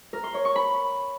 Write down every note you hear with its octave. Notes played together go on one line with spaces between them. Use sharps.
A#4
C6
C#5
C#6
B5